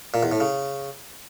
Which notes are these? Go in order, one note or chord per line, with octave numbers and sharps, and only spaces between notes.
A#2
E2
A2
C#3